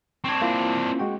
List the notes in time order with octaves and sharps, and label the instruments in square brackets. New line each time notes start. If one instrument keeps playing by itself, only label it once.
[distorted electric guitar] C4 D4 [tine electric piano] C#6 G#6
[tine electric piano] A#3 E4 F4
G#3 F#4 G5